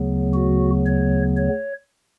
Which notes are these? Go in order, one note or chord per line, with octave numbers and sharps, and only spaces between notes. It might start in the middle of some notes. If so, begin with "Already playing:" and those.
Already playing: D2 C#3 F#3 B3
F#4
C#5
C#5